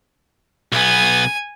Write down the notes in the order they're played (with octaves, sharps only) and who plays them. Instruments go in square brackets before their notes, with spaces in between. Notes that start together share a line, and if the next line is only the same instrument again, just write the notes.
[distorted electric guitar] B1 B3 [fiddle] G#5